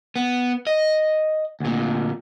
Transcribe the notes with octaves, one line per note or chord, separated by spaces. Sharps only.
B3
D#5
D2 A#2